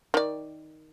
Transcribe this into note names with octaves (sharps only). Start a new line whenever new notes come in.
D#3 D5